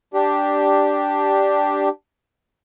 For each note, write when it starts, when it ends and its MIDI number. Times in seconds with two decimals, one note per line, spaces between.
0.14 1.89 62
0.14 1.89 67